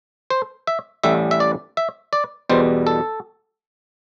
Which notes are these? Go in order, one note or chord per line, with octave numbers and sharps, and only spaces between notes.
C5
E5
A1 A2 G3 E5
E5
D5
E5
D5
E2 B2 G3 C5
A4